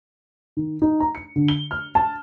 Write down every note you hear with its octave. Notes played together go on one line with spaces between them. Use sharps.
D#3
D#4
A#5
C#7
D3
G7
F6
A5